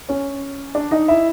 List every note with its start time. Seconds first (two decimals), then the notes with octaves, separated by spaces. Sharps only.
0.09 C#4 C#5
0.75 D4 D5
0.91 D#4 D#5
1.08 E4 E5